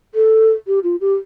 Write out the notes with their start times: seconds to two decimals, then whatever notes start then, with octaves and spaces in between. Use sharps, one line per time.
0.15 A4
0.67 G4
0.84 F4
1.01 G4